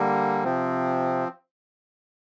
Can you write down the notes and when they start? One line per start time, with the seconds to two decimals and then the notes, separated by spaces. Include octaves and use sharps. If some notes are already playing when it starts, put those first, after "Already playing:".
Already playing: D3 G3 A#3
0.44 C3 F3 C4